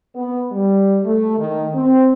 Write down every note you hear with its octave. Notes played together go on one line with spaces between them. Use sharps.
B3
G3
A3
D#3
C4